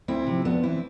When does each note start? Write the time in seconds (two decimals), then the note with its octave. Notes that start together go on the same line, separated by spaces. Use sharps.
0.08 D2 C4 E4
0.27 C3 F3
0.45 F2 B3 D4
0.63 E3 C4 E4